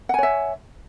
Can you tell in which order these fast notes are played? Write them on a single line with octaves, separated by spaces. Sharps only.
F#5 G#5 C#5 E5